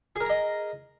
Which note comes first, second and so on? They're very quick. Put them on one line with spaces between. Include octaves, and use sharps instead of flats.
G#4 A#4 A#5 D#5